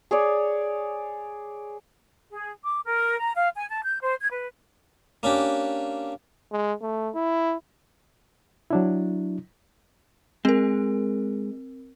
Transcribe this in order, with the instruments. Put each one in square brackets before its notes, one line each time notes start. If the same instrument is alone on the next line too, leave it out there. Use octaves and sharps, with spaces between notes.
[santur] G#4 C#5 D5
[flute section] G#4
D6
A#4
A#5
F5
G#5
A5
G6
C5
G#6
B4
[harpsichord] A#3 C#4 D4 G4
[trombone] G#3
A3
E4
[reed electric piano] F#3 D4 E4
[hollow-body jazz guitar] G#3 [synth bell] C4 A#4